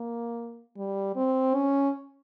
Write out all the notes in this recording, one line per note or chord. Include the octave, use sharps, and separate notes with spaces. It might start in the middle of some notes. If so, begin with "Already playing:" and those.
Already playing: A#3
G3
C4
C#4